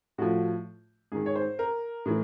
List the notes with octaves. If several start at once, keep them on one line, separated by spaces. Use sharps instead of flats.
A2 F3 F#4
G#2 D#3 G#4
C#5
C5
A#4
A2 E3